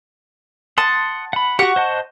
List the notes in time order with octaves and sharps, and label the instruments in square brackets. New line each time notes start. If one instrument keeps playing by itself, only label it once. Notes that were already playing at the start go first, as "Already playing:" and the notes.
[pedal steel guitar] F#5 C6 D#6 [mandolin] A5
[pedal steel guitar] F#5 B5
[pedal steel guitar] F#4 G4 [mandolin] F#5 C#6 F#6
[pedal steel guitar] C5 D#5 A5